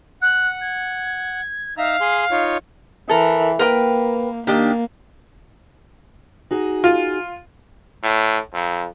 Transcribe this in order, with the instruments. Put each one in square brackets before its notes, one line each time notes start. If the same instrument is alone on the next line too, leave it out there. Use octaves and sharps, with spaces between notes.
[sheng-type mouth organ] F#5 [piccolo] F#6
[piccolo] G#6
[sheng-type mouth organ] D#4 E5 A#5 [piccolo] F5
[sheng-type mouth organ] G#4 C6
D#4 F4 C#5
[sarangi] E3 [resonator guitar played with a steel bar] A4 A#4
[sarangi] A#3 [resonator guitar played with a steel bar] A#4 B4 G5
[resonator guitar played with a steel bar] D#3 D4 G4 [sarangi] A#3
[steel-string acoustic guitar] D#4 F#4 G#4
[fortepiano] F4
[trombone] A2
F2